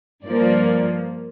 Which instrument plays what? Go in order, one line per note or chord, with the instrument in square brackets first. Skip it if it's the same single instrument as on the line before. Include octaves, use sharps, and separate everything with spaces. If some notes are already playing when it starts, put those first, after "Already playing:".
[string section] G2 F3 A#3 D5